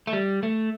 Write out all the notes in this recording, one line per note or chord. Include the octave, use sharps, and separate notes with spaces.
A3
G3
A3